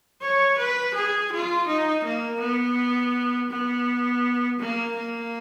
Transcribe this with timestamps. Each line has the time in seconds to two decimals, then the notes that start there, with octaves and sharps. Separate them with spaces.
0.21 C#5
0.58 B4
0.94 G#4
1.32 F4
1.67 D#4
2.04 A#3
2.40 B3
3.50 B3
4.59 A#3
4.96 A#3